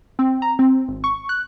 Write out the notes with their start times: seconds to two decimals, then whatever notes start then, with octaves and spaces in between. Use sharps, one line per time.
0.19 C4
0.42 A#5
0.59 C4
0.88 G#1
1.04 C#6
1.29 F#6